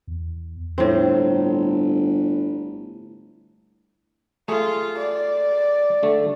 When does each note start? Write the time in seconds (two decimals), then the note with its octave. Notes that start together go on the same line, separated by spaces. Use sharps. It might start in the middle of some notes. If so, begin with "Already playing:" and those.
0.07 E2
0.78 G1 A2 C4
4.48 A3 F4 G#4
4.98 D5
6.03 D3 A3